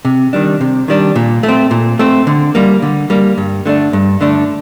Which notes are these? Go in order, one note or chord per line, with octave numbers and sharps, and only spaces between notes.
C3
D#3 G3 D4
C3
D#3 G3 D4
A#2
A3
C4
A#2
A3 C4
D3
G3 A#3
D3
G3 A#3
G2
D3 A3 D4
G2
D3 A3 D4